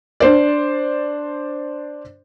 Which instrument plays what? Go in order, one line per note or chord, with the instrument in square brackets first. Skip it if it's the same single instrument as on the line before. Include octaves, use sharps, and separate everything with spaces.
[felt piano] D4 C5 D5